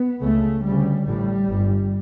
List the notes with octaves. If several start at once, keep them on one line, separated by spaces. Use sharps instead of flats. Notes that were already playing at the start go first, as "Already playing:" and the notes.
Already playing: B3
C#2 C#3 A3
D2 C#3 G3
A1 A2 G3
G1 G2